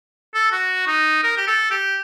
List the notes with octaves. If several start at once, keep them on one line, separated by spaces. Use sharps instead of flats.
A4
F#4
D#4
A#4
G4
A4
G4